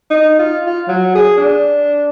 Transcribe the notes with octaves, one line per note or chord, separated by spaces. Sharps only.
D#4
F4
F4
F#3
G#4
D4